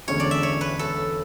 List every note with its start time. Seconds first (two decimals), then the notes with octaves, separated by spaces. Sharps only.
0.07 E1 D2 D3 G#3 C#4 C#5
0.20 D5
0.31 E5
0.43 C#5
0.61 B4
0.79 A4